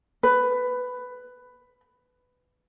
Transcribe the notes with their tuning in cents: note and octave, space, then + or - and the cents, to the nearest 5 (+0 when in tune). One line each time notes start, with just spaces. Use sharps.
B4 +10